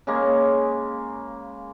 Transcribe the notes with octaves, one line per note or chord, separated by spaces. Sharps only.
C#3 G#3 A#3